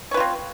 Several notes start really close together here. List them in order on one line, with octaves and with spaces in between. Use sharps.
C#5 B4 F4 C4